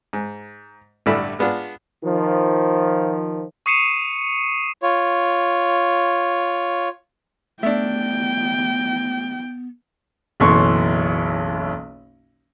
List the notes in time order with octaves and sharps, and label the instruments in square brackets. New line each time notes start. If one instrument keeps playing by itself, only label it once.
[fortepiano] G#2
A1 G2 D3 A3 E4 B5
G#3 B3 D4 F4
[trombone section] D#3 F3
[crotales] C#6 D#6 C7 C#7 D#7 E7
[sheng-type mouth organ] F4 C#5
[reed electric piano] A3 [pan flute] B3 [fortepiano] D4 E5 [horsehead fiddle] G5
[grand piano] F#1 B1 E3 C6 C#6